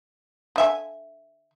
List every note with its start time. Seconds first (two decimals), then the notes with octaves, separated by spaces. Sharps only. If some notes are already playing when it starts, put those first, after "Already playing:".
0.56 D3 E5 G#5